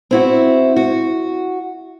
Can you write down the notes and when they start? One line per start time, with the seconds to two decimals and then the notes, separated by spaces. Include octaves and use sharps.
0.11 C4 E4 F#4
0.76 F#4